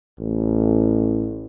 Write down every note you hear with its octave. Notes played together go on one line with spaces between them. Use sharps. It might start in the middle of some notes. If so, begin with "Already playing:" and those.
A1